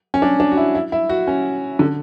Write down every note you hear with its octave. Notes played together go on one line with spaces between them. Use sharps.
C#4
D4
D4
F#4
E4
E4
E4
F#4
C#4
D3